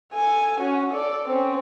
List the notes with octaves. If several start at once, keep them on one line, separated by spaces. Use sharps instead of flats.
A4 G#5
C#4 F#4
A4 D5
C4 C#4